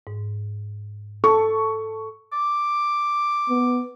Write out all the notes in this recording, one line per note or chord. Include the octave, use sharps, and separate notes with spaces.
G#2
A4 C#6
D6
B3